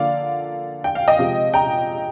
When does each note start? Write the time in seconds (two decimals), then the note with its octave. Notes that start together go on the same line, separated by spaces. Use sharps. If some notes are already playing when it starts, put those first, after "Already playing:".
Already playing: D3 F3 A#3 D5 F5
0.84 G5
0.95 F5
1.08 D#5 G5
1.19 C3 F3 G#3
1.54 G5 A#5